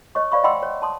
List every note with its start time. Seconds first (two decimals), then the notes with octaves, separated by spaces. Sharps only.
0.15 C#5 D#5 C#6
0.32 C5 D5 F5 B5 C#6
0.44 D#5 F#5 G5 B5 C6 E6
0.63 C#5
0.82 A5 C6 D#6